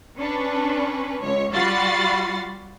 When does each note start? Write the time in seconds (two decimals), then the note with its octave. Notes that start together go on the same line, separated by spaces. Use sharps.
0.18 C#4 D4 B4
1.23 C#2 C#5
1.52 G3 F4 F#4 B5 A6 C7